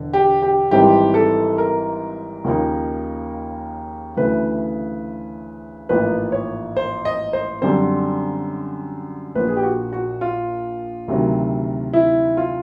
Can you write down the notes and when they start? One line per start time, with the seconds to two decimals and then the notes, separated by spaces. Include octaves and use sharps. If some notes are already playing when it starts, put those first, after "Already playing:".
Already playing: E1 D3
0.13 G4
0.42 G4
0.71 G#1 G#2 E3 G3 C4 G4
1.14 A4
1.58 A#4
2.44 D#2 C#3 F3 A#3 D#4
4.16 D2 C#3 E3 A3 B4
5.89 A1 G#2 F3 A#3 B4
6.32 C#5
6.77 C5
7.05 D#5
7.33 C5
7.62 F#2 D3 G3 C4 C5
9.35 A#1 A#2 F3 B4
9.48 G#4
9.57 G4
9.63 F#4
9.93 F#4
10.21 F4
11.08 D2 C3 D#3 F#3
11.93 E4
12.37 F4